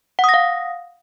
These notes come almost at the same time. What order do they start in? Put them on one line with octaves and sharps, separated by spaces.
F#5 D#6 A#6 F5